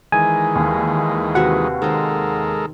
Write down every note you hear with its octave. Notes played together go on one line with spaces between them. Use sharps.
D#3 E3 G#3 G#5
D#2
C3 F#4 B4 F#5
D#3 G#3 A4 A#4 C5